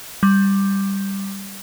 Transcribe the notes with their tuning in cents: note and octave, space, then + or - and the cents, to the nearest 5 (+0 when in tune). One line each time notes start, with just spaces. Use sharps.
G3 +5